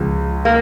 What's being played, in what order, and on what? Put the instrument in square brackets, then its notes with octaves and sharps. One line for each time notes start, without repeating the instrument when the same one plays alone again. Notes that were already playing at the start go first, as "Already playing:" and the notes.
Already playing: [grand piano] C#2 C#3 F3
[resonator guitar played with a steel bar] A#3